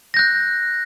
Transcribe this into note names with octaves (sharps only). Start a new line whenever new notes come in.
F#6 G6 A#6